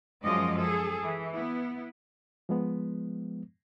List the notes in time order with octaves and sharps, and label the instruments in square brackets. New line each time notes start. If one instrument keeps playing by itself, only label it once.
[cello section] F#2 F3 G#3 D5 D#5
G#4 A4
E3
B3 E4
[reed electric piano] F3 G#3 B3